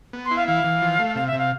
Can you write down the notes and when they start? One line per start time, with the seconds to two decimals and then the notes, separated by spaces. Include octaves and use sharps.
0.13 B3
0.25 C6
0.31 E4
0.36 F5
0.47 E3 F5
0.64 E3
0.82 F3
0.99 A3
1.15 C3 F5
1.27 E5
1.33 C3
1.38 F5